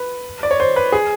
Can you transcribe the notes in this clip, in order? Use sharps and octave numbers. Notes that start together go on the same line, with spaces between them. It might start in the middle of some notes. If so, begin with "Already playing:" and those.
Already playing: B4
D5
C#5
C5
B4
G#4